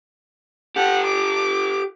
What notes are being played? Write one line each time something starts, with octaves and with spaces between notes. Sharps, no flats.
G4 A4 F#5
D6